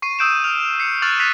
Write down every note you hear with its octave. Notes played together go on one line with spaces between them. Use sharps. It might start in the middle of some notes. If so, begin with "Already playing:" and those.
C#6 C7 D#7
D#6 E6 G6 D7 E7
F6 F7
C7 C#7
C#6 F6 F#6 A6 F7 F#7
F#6 A6 B6 C7 D#7 F7